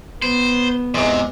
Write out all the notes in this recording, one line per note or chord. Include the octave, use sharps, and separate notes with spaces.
B3 C5
E2 G#2 C3